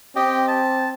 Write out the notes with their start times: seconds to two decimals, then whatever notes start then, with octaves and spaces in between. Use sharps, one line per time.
0.16 C4 G4 D#5 G5
0.48 A5